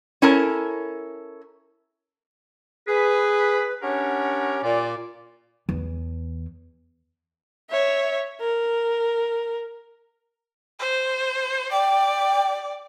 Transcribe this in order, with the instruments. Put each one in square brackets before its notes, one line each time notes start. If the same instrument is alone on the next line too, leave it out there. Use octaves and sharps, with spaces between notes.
[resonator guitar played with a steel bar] C#4 E4 A4 A#4 A5
[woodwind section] G#4 B4
C#4 D4 G4 A#4 C#5 F#5
A#2 D5
[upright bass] E2
[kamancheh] C#5 E5
A#4
[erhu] C5
[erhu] D5 [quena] G5